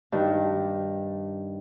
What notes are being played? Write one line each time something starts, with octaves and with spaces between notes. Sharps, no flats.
G2 D#3